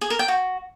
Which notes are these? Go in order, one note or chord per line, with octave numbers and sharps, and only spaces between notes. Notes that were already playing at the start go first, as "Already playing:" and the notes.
G#4
A#4
G5
F#4